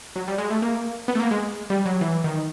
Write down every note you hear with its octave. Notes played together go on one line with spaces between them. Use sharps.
F#3
G3
G#3
A3
A#3
B3
A3
A#3
G#3
G3
F#3
E3
D#3